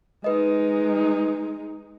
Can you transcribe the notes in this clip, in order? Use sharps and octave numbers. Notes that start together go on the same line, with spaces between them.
G#3 D#4 B4 D#5